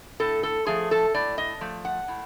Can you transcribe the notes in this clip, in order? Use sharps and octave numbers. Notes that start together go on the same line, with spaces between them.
A2 A4
A4
F3 A3 G#4
A4
A2 D5
D#5
F3 A3
F#5
A2